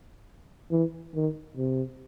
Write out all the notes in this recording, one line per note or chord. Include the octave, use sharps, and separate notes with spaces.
E3
D#3
C3